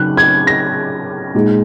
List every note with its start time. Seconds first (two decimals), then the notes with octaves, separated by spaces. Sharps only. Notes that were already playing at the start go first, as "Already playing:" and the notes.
Already playing: C#3 F#3 D#4 F#6
0.17 G#6
0.47 A#6
1.34 A#2 G#3 D#4